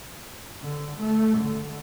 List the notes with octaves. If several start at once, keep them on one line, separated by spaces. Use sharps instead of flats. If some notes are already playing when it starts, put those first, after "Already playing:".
D3
A3
D3